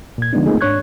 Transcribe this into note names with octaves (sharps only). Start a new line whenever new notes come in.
A#2 G#6
D3 F3 G#3 B3 D4 D#4
A3 A#3 C4 D#4 F4 G#4
G#2 D4 C#5 C#6 F#6 G#6